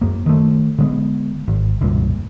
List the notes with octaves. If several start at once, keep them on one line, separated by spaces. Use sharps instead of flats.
F#2 A#3
D#3 A3
D3 G#3 B3
G#1
E1 C#2 G2 A#2